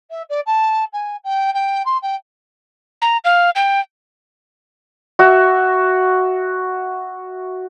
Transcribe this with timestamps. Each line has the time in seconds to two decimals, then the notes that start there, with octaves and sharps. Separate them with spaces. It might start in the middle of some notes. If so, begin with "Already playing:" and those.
0.10 E5
0.29 D5
0.46 A5
0.93 G#5
1.24 G5
1.54 G5
1.85 C6
2.02 G5
3.02 A#5
3.24 F5
3.55 G5
5.19 F#4 E5